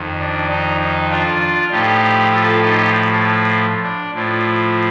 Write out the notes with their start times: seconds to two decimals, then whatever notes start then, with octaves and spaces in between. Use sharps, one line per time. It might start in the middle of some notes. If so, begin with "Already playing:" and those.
Already playing: F2 D#3
0.19 D4
0.50 D#4
0.80 D#4
1.10 D4 F4
1.71 A2 F3 D#4 G4
2.32 F4 A4
2.62 D#4 G4
3.84 D4
4.14 A2 F3